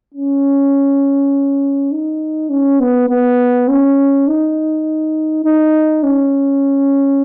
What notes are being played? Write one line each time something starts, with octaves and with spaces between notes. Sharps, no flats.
C#4
D#4
C#4
B3
B3
C#4
D#4
D#4
C#4